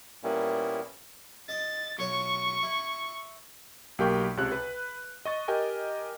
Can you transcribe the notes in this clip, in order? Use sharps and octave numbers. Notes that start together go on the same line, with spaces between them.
A#2 G3 A#3 B3 C#4 E4
D#5 A6
B1 C#5 C#6
E4
B1 A#3 G4 A#4 G5 C#6
C#2 C3 C#5 F#6
B4
D#5 C#6 A6
G4 A#4 D#5 G5 G#5